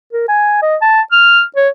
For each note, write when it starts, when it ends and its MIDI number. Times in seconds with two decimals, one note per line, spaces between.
0.13 0.24 70
0.28 0.58 80
0.62 0.76 75
0.81 1.01 81
1.12 1.42 89
1.56 1.69 73